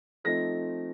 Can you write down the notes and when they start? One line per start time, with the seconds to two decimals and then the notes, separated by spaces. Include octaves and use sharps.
0.24 F3 A3 C4 D#4 A#6